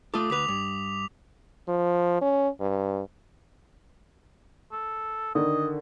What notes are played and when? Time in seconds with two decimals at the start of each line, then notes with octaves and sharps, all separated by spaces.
0.14 A3 F4 A4 D6 D#6
0.30 D2 B4 D6 B6 F7
0.48 G2
1.68 F3
2.21 C#4
2.60 G2
4.72 A4
5.35 D3 D#3 D#5